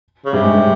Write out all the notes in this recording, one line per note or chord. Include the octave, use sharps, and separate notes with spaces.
C#3
G2 C3 G3
G#2 G#3
G#3